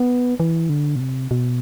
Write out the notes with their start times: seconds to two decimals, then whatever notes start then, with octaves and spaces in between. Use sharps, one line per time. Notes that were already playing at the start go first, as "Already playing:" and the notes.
Already playing: B3
0.40 E3
0.69 D3
0.96 B2
1.00 C3
1.31 B2